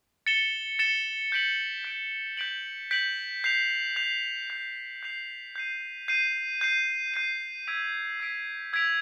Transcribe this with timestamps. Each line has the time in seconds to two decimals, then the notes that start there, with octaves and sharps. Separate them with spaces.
0.26 A6 C#7 E7 G7
0.79 A6 C#7 E7 G7
1.32 G6 B6 D7 F#7
1.84 G6 B6 D7 F#7
2.37 G6 B6 D7 F#7
2.91 G6 B6 D7 F#7
3.44 G6 C7 F7
3.96 G6 C7 F7
4.50 G6 C7 F7
5.03 G6 C7 F7
5.56 G6 C7 D#7
6.08 G6 C7 D#7
6.61 G6 C7 D#7
7.14 G6 C7 D#7
7.67 E6 G#6 B6 D7 F7
8.20 E6 G#6 B6 D7 F7
8.73 E6 G#6 B6 D7 F7